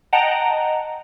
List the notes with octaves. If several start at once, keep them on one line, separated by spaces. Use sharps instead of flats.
D#5 F#5 G5 A5 A#5